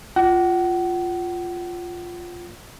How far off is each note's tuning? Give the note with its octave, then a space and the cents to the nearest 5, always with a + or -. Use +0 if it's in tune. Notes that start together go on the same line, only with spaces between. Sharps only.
F4 +0 F#5 +35